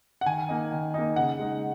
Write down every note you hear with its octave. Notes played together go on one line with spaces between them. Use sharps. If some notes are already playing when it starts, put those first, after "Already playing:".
F#5
D#3 G#5
A#3 D#4
D#3
A#3 D#4
C#3 F#5
G#3 D#4